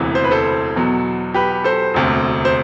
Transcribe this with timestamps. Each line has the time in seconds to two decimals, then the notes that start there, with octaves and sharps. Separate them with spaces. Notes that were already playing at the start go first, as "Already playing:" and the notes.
Already playing: E1 D2 C3 E3
0.15 C5
0.24 B4
0.31 A4 C5
0.76 E2 B2 F#3
1.34 G4 B4
1.64 A4 C5
1.94 E1 D2 C3
2.45 C5